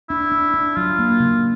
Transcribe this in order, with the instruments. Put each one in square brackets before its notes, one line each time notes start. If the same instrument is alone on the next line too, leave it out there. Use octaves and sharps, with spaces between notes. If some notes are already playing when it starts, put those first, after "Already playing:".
[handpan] D4 [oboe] E4
[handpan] D4
D4
[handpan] F#3 [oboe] F4
[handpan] A#3
C#3